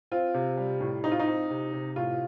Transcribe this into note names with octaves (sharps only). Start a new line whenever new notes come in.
C4 F4
C3
G3
A2
C4 D#4
F4
D#4
C4
C3
C3
A2 F4